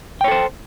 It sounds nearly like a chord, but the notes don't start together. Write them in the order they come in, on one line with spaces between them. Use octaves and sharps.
G5 C#5 A4 C5